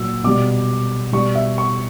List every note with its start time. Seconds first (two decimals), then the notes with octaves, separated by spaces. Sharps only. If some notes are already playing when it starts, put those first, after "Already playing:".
Already playing: A#2 F#3 E6
0.24 B2 G3 D6
1.13 G3 C#6
1.16 B2
1.35 E5
1.58 C#6